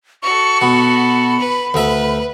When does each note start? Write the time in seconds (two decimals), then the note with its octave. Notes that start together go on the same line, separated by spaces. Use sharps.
0.23 F#4 A4 C#6
0.61 B2 B5
1.39 B4
1.74 D2 B4 E5